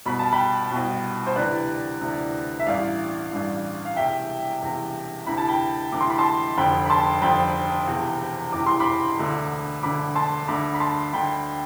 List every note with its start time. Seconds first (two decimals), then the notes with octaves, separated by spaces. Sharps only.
0.06 C2 B2 B5
0.19 A5
0.32 G5 B5
0.71 B2
0.76 C2
1.26 C5
1.36 D2 C3 E3 B4 D5
2.01 D2 C3 E3
2.60 E5
2.66 A1 G2 E3 D5 F5
3.31 A1 G2 E3
3.85 F5
3.96 E1 E2 C3 E5 G5
4.62 E1 E2 C3
5.27 D2 C3 E3 B5
5.38 A5
5.48 G5 B5
5.92 D2 C3 E3 D6
6.01 C6
6.10 B5
6.19 A5 C6
6.57 F1 F2 D3 G5 B5
6.85 B5
6.90 A5 C6
7.22 F1 F2 D3 G5 B5
7.87 E1 E2 C3 E3
8.52 E1 E2 C3 E3 D6
8.66 C6
8.80 B5 D6
9.18 E1 D2 D3
9.83 E1 D2 D3 B5 D6
10.15 A5 C6
10.48 D2 D3 B5 D6
10.74 B5
10.80 A5 C6
11.13 D2 D3 G5 B5